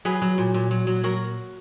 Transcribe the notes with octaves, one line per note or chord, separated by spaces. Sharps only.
F#3 G#4 B4
F#3
A#2
A#2
F#3
F#3
F#3 F#4 A#4